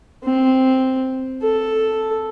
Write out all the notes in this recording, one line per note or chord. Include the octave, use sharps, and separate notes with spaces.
C4
A4